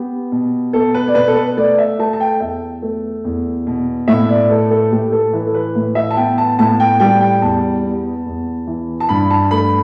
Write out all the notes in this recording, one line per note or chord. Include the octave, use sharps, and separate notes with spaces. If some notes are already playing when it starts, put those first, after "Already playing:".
Already playing: B3 G4
B2
B2 A4
B4
D5
B2 B4
A4
B4
A3 D5
E5
A3 A5
A5
G5
E2 E5
A3
E2
B2
A2 E5
D5
A3 A4
A4
A2 G4
A4
E3 B4
A4
B4
A2
E5
A5
B3 G5
A5
A2 A5
G5
G3 G5
G5
E2 A5
B3
E2
E3
A5
G2 B5
A5
A3 B5